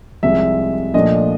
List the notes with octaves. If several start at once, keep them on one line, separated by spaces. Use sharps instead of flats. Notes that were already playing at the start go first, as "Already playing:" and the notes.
C2 C3 F3 G#3 E5
A#2 F3 A3 D4 D#5